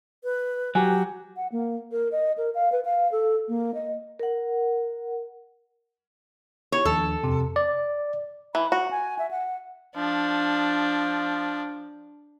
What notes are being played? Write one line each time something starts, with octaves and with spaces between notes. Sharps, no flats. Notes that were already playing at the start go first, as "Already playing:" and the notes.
B4
F#3 G4 G#5
F#5
A#3
A#4
D#5
A#4
F5
B4
F5
A4
A#3
D#5
A#4 F#5
B3 E4 G4 C#5
D#2 F3 D4 A4
F2 C3
D5
E3 B5
F#4 F#5
G#5
E5
F#5
F3 D4